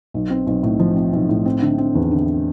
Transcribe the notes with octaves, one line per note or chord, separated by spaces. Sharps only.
B1
C4
B1
A2
F3
C4
B1
A2
C4
D3
C4
E2
D3